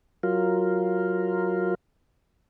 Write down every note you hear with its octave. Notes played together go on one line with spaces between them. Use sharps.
F#3 F4 A#4